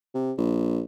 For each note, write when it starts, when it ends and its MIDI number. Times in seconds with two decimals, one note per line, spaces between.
0.15 0.33 48
0.38 0.82 34